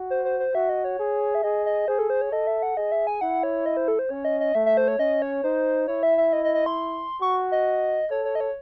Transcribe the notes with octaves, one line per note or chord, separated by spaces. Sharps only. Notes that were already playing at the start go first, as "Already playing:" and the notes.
Already playing: F#4
C5
C5
C5
F#4 E5
D#5
C#5
G#4
E5
G#4 D#5
D#5
G#4 C5
A4
C5
C#5
A4 D#5
E5
F#5
G#4 D#5
E5
G#5
E4 F#5
C#5
D#5
C5
A4
C5
C#4 C#5
D#5
D#5
A3 E5
E5
C5
C#5
C#4 D#5
C#5
D#4 C5
E4 C#5
E5
E5
D#5
D#5
D#5
C6
F#4 C#6
D#5
A4 C#5
C#5
D#5
C#5